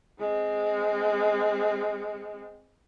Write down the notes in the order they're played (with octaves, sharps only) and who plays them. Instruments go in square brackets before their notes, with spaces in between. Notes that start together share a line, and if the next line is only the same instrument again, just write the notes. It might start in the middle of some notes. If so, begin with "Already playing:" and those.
[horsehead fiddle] G#3 C4